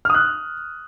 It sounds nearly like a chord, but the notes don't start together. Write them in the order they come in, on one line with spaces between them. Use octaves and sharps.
F6 D#6 F#6